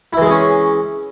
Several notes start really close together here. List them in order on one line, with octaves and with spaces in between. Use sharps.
E4 E3 G#3 G#4 C#4